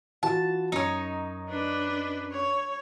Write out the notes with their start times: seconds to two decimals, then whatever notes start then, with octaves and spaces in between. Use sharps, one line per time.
0.23 E3 F4 F#4 A5
0.72 F#2 D#4 C#5
1.49 D4 B4
2.32 C#5